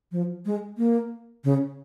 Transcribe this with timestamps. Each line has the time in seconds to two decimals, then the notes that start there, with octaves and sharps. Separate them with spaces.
0.12 F3
0.46 G#3
0.78 A#3
1.44 C#3